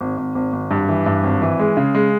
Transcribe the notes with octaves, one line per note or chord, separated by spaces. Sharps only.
G#1
G#1
G#1
G#1
G2
E3
G2
G#1
E3
G#3
C#3
G#3